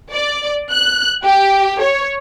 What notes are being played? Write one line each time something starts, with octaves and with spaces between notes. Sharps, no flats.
D5
F#6
G4
C#5